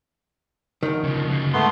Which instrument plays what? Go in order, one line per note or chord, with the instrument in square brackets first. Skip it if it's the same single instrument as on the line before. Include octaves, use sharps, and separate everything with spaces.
[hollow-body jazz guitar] D2 D#3
[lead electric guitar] C#3 F3
C#3 A#3
[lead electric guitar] G#2 [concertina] A3 B3 C6